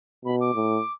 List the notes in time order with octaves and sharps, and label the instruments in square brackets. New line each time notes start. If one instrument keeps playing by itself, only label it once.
[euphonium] B2 [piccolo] B5
[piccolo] D6
[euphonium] A2